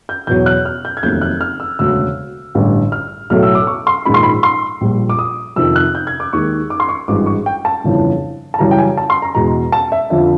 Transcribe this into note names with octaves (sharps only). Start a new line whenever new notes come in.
G6
E2 B2 F#3 G6
F#6
F6
G6
G#6
F1 D#2 D#3 F#3 A3 G6
F#6
F6
E6
E1 D2 C#3 E6
A1 G2 D3
F6
B1 A2 F#3 A3 F6
E6
D6
C#6
C6
A#1 G#2 D#3 G#3 B5
C6
B5
C6
A#1 A#2 G3
D6
D#6
F2 C3 D#3 E6
F#6
G6
G#6
D6
D#2 D#3 G#3 C#6
D6
C6
C#6
G#1 G2 E3 G#3 D6
C#6
G5
A5
G1 F2 C#3 E3
A5
F#2 C#3 E3 G3 A#5
G5
G#5
A5
C6
A#5
E2 B2 G#3 A#5
A5
E5
F2 D3 F3 E5